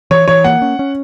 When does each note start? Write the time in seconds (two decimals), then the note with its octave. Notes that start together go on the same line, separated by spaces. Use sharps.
0.11 E3 C#5
0.28 E3 C#5
0.44 A#3 F#5
0.62 C#4
0.79 C#4